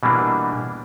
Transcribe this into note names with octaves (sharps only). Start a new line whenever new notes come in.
B2 E3 G3 A#3 D4